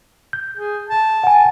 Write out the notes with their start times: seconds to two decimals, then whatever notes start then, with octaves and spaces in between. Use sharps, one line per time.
0.33 G6
0.57 G#4
0.89 A5
1.24 F#5 G#5